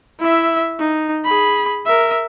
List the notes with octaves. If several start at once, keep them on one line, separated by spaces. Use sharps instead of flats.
E4 E5
D#4
G#4 B5
A#4 E5